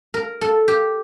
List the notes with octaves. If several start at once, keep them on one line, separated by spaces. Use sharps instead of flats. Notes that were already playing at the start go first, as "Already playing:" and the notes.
A#4
A4
G4